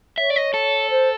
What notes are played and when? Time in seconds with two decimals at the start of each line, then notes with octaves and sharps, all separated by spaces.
0.18 C#5 E5
0.30 D5
0.36 D#5
0.54 A4
0.90 C5